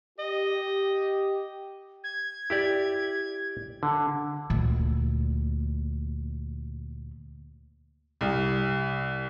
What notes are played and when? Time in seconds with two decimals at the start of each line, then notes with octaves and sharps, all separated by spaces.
0.19 G4 D#5
2.04 G#6
2.50 E4 G4 D5
3.83 D3
4.50 D2 A#2
8.21 C2